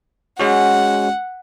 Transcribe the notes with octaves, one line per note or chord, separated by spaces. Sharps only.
G#3 C#4 F#4 F#5